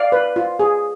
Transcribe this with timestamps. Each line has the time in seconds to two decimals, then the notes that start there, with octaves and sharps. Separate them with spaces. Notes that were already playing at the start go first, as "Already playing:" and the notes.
Already playing: D5 F5
0.12 B4
0.36 F4
0.59 G#4